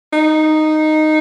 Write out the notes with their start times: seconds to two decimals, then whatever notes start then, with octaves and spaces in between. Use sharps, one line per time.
0.13 D#4